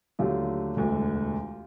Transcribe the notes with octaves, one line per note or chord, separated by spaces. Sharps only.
D#2 D3 F#3 A3 F4 G4
E1 D2 D3